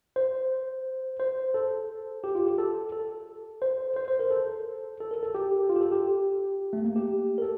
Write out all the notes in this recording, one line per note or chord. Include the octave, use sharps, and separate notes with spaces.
C5
C5
A4
G4
F4
G4
A4
A4
C5
C5
C5
A#4
A4
A4
A#4
A4
G4
F4
G4
A4
G4
A3
A#3
G4
A#4
A4